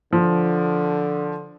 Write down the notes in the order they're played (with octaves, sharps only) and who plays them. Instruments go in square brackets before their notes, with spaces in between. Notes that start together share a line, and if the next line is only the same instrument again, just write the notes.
[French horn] D3 [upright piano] F3